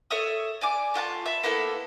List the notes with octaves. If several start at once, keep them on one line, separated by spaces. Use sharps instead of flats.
A4 C#5 E5 D#6
D5 G#5 D6
A3 F4 F#5 A5
E5 B5
A#3 B3 E4 A4